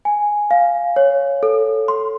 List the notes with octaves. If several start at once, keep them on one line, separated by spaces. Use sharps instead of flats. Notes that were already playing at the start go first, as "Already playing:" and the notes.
G#5
F5
C#5
A4
C6